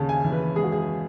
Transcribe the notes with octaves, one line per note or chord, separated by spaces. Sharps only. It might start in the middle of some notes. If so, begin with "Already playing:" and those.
Already playing: D#2 C#3 A5
G#5
E3
B4
G#3 G#4
F#4
G#4